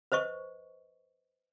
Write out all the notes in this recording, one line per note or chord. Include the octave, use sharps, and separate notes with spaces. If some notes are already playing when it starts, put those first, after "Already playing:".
B4 C5 D#5 C#6